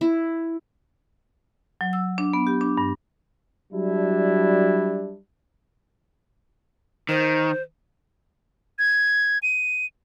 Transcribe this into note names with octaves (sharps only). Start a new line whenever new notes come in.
E4
F#3
E6
D4
B3
G4
D4
G2
F#3 G3 D4 E4
D#3 C5
G#6
D#7